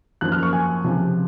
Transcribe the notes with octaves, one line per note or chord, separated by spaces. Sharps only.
F#2 F3 A#3 F#6
F6
C#6
G#5
C#2 C3 F3